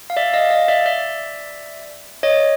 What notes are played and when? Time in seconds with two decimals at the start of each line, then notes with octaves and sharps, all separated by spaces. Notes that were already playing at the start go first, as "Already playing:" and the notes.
0.10 F5
0.17 D5 E5
0.33 D#5 F5
0.51 D#5 F5
0.68 D5 E5
0.86 D5 E5
2.23 C#5 D#5